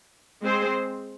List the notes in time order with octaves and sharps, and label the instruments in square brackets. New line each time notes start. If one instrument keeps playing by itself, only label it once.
[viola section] G#3 C4 G#4 C5